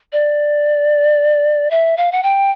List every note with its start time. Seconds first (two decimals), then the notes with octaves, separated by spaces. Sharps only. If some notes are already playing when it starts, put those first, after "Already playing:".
0.12 D5
1.71 E5
1.97 F5
2.12 F#5
2.23 G5